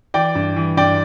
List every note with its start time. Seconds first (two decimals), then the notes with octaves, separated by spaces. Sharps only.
0.14 E3 D5 G5
0.35 G2
0.56 E3
0.77 G2 D5 G5